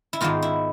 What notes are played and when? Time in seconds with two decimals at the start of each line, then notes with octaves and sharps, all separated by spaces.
0.13 E4
0.20 G#2 D#3 G#3 B3 F4
0.42 E4